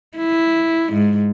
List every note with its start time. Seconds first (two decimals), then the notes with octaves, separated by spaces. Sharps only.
0.17 E4
0.93 G#2